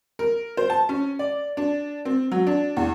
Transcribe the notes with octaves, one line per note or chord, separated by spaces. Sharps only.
A#4
C5
A5
C#4
D5
D4
C4
F#3
D4
E2